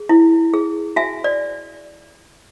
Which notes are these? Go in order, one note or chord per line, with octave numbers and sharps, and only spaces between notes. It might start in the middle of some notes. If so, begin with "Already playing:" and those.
Already playing: G#4
E4
G#4
F#4 E5 G#5
D5